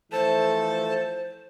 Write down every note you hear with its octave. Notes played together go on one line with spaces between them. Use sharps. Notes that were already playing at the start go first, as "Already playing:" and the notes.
E3 F3 A3 A4 C5 A5